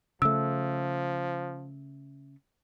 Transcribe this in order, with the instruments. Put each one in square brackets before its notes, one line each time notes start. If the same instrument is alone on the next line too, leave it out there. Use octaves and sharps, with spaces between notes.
[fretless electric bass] C#3 A3 [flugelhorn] F3 [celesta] E6